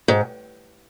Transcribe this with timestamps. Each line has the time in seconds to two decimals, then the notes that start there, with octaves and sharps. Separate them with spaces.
0.08 G#2